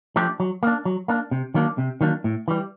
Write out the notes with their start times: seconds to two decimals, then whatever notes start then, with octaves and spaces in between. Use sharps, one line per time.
0.16 F3 A3 D4 G4
0.40 F#3
0.63 A#3 D4
0.85 F#3
1.08 A#3 D4
1.31 C3
1.54 D#3 F#3 A#3 D4
1.78 C3
2.01 D#3 F#3 A#3 D4
2.24 A2
2.48 E3 G3